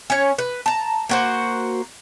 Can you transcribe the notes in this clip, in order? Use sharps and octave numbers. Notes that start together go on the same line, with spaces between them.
C#4 C#5
B4
A5 A#5
A#3 F#4 C5